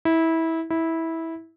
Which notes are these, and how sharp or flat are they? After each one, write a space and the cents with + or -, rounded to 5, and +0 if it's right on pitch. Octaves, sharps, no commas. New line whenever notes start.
E4 -20
E4 -15